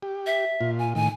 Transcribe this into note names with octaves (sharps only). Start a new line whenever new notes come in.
G4
E5
A#2 F4
G#5
A2 D#3 G#5